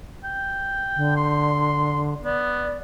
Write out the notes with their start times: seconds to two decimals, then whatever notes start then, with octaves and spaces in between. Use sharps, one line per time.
0.24 G5
0.96 D3
1.17 C6
2.24 B3 D5